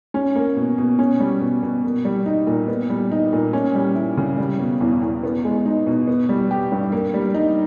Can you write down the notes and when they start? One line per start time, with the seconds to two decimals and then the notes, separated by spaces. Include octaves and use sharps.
0.14 C#4
0.36 A#3
0.57 B2
0.78 B2
0.99 C#4
1.20 G3
1.41 B2
1.63 B2
1.84 A#3
2.05 G3
2.26 D#4
2.47 A#2
2.68 B3
2.90 G3
3.12 D#4
3.33 A#2
3.53 C#4
3.75 G3
3.95 E4
4.17 C#3
4.38 G3
4.60 B2
4.81 E2
5.02 E2
5.24 B3
5.44 G#3
5.65 D#4
5.87 B2
6.07 B3
6.29 G3
6.51 G4
6.72 G2
6.92 A#3
7.14 G3
7.34 D#4